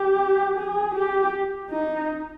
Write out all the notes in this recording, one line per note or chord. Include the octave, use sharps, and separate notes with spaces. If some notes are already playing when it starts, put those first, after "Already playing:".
Already playing: G4
G#4
G4
D#4